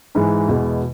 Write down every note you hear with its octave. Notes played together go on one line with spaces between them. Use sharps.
G#2 E3 G#3
E2 B2 G#3